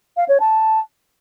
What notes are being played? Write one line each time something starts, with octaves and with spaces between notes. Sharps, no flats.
F5
C#5
A5